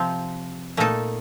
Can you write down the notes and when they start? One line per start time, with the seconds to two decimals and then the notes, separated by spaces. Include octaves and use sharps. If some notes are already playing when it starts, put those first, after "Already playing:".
Already playing: C3 F3 C4
0.77 A#2 A3 D#4 A4